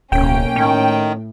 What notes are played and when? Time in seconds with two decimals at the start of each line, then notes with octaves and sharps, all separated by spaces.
0.12 D1 B1 A#3 C#4 G5
0.56 A2 D#3 C#4